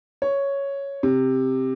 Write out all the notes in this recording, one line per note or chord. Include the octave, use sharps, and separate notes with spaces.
C#5
C3